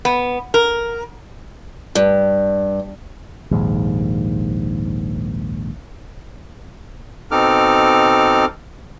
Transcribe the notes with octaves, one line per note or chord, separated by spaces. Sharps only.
B3
A#4
G2
A#1 D#2 G#2
B2 C4 D#4 A4 D6 F6